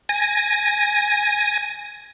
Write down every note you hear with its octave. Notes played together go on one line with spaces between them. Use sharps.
G#5 A#6